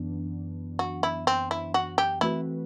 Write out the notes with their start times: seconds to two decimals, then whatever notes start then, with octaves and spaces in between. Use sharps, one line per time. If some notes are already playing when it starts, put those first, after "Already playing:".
Already playing: F#2 E3 B3 D4
0.79 F#4
1.03 E4
1.27 C4
1.51 E4
1.74 F#4
1.98 G4
2.21 E3 A3 C4 E4 F#4 B4